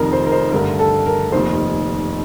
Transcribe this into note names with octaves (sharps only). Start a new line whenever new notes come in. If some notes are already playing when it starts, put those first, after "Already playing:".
Already playing: F1 F2 D#3 A#4
C5
A#4
C5
G2 D3 A3 A#4
A4
A#4
F1 D#2 D#3 C5